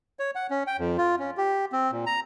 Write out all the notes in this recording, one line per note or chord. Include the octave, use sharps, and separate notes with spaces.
C#5
F#5
C#4
G5
F2
F4
C#4
G4
C4
A#2
A#5